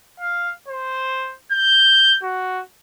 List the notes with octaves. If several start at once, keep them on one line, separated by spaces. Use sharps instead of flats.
F5
C5
G6
F#4